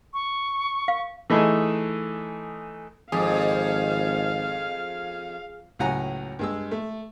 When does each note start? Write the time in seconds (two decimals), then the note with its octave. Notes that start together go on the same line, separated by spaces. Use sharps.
0.14 C#6
0.88 F5
1.30 E3 A3 D#4 G#4 A4
3.12 G#1 F2 G#4 F5
5.79 C#2 A2 F#3 F#5 G#5 A#5
6.39 G2 G#3 E6
6.71 A3